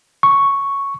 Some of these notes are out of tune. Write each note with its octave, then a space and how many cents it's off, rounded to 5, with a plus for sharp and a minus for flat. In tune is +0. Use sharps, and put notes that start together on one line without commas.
C#6 +0